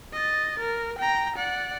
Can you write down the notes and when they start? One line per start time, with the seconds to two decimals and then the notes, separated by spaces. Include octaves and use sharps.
0.13 D#5 A6
0.59 A#4
0.99 G5 A#5
1.36 D5 F#5